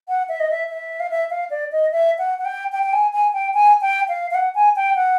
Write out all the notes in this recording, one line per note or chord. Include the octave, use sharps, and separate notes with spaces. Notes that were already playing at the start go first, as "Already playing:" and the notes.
F#5
E5
D#5
E5
E5
F5
E5
F5
D5
D#5
E5
F#5
F#5
G5
G5
G5
G#5
G#5
G5
G#5
G5
F5
F5
F#5
G#5
G5
F#5